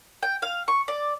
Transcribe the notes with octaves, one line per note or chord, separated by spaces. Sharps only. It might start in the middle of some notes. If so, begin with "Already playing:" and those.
G5
F5
C#6
D5